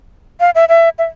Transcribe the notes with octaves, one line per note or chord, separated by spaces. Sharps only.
F5
E5
E5
E5